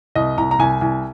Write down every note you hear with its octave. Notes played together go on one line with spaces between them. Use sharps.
C2 D#5
C2 A#5
A#5
C2 G#5
C2 G#5